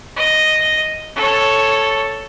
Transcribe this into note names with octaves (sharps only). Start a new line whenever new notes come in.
D#5
A4 C#5